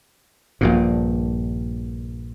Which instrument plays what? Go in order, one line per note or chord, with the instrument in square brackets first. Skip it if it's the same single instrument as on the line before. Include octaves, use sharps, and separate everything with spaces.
[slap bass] A#1 G2 A#2